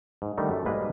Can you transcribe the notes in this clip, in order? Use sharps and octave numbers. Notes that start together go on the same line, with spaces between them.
G#2
D3 D#3 G3 A3 D#4
F#2 A3
B1 G#2 G3 G#3 A#3 B4